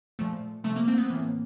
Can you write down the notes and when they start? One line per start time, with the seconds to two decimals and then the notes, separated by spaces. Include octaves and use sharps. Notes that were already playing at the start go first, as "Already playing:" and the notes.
0.19 A#2 F3 A3
0.64 C3 F3 A3
0.76 A#3
0.88 C4
0.98 B3
1.10 A2 E3 A#3